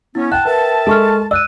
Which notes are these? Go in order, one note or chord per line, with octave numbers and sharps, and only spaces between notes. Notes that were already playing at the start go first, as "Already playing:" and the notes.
B3 C#4 E4
F#5 G5 A5 F#6
A#4 B4 E5 A5
G#3 A4 C#6 F6
D5 E6 F#6 D#7